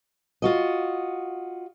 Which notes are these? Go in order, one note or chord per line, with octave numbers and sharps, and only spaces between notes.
F4 F#4 D#5